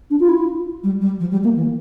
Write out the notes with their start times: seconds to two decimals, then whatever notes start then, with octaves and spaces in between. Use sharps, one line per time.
0.10 D4
0.20 F4
0.29 E4
0.84 G3
1.01 G3
1.20 F3
1.31 G3
1.44 A#3
1.56 E3